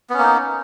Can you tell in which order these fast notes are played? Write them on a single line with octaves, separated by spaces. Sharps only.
B3 C#4 A#3 D#4